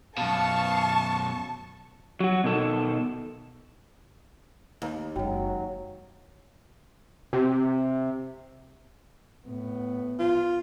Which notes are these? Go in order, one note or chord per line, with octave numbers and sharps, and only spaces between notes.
F#2 B2 F5 A5 C#6
F#3 F#4
B2 D#3 A4
D#2
F#1 F#3 G#3 F#4 G5
C3
A2 B3
F4